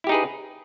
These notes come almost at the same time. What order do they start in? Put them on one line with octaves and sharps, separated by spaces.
E4 G4 D#4 G#4 B4